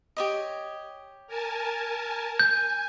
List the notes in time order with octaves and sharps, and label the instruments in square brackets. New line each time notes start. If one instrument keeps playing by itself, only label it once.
[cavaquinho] G4 C#5 D#5
[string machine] A#4 G#5 A5
[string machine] G#5 [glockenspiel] G6